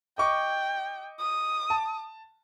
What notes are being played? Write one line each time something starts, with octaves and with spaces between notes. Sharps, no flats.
D#5 G5 C#6 D6
D#6
A5